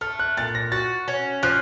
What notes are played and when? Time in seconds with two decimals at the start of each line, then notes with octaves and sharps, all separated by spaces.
0.01 A3 F6
0.19 F#6
0.37 A#2 A6
0.55 A#6
0.72 F#4 A6
1.08 C#4
1.43 F3 F#6